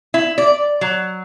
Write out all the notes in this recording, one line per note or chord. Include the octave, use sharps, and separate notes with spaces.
E4
D5
F#3